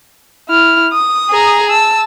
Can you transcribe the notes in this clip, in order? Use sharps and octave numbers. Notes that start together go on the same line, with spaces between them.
E4 F6
D#6
G#4 A#5
A5 E6